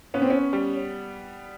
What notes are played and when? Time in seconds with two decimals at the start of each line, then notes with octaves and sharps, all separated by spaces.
0.14 B3 C#4
0.22 C4
0.30 C#4
0.53 G3